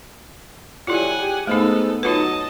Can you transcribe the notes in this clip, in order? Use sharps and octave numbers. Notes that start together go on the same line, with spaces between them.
A2 F#3 G3 E4 F4 F#5 G#5
G4 G#4
G#2 A3 B3 D#4 A4
F#3 D#4 F4 B4 D#5 A5